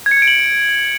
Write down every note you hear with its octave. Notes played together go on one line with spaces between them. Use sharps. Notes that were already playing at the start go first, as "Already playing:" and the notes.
G#6
C#7
G#6
D7
F#7